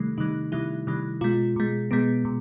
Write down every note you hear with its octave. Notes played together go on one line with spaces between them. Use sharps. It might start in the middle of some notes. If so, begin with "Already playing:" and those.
Already playing: C3 D#3 G3 A3
C3 D#3 G3 D#4
C3 D#3 G3 E4
C3 D#3 G3
B2 G#3 F4
B2 G#3
B2 G#3 B3
B2